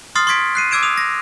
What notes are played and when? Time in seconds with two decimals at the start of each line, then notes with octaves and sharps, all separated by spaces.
0.15 C6 D#6 F6 A6 C7
0.27 C6 C#6 D#6 G#6 B6 D7
0.55 F#6 C7 D#7
0.71 D6 E6 G#6 D7 E7
0.83 D#6 F7
0.97 A#6